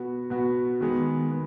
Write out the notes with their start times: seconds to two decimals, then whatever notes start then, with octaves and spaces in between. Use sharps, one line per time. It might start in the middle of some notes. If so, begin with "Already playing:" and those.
Already playing: B2 B3 F#4
0.30 B2 B3 F#4
0.81 D#3 G#3 B3
1.31 B3